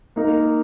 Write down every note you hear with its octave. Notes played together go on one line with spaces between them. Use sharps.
A#3 D#4 A#4